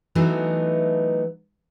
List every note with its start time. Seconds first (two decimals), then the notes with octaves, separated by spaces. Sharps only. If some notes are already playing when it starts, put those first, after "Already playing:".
0.15 E3 F#3 A3 B3 D4 D#4